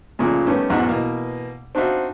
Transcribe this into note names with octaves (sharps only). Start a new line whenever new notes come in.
A#2 C#3 F3 G#3 A3
D#3 G3 A3 B3 C#4
B1 E2 G#2 E3 F#5 F#6
B2 E3 A#3
C4 D4 D#4 F#4 E5 F5